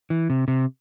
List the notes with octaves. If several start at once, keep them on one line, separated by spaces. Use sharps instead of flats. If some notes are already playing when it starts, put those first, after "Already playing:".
E3
C3
C3